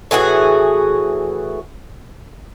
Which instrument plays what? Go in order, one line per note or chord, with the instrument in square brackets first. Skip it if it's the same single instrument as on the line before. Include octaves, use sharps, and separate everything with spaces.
[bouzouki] A2 E3 F#4 G#4